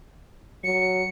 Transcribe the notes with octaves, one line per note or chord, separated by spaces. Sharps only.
F#3 C#7